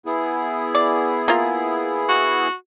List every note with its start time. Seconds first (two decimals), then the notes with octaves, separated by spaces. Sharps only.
0.06 B3 E4 G#4
0.75 D5
1.28 A#3 F4
2.09 F#4